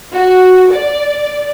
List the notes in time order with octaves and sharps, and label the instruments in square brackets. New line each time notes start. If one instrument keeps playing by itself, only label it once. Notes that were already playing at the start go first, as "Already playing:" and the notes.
[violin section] F#4
D5